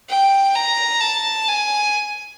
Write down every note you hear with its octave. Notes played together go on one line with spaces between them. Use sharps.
G5
A#5
A5
G#5